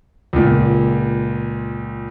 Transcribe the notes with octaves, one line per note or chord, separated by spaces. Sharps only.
C#2 A#2